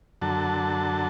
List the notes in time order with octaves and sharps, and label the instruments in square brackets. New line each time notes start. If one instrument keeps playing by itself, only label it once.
[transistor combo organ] F#2 D3 F#3 A4 A5